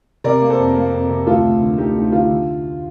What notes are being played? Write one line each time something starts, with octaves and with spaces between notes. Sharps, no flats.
C3 A#4 D5
A#3
A4 C5
F2
A#3
F2
C3
D2 F4 A4
D2
D3
D2 D#4 G4
D2 D#4
G4
D3 F4
D3